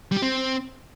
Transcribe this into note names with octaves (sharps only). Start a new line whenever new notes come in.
G3
G4
C4